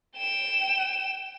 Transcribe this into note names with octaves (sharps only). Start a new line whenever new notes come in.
G5 E7